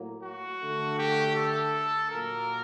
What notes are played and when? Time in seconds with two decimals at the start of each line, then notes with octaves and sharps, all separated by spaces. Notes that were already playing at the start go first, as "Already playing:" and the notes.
Already playing: A2 F#3 A#3
0.23 F#4
0.61 D3 A3
0.98 G4
1.36 A4
2.11 A#2 F#3 A#3 A#4